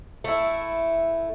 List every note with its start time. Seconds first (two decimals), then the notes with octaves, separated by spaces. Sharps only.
0.24 A3 E4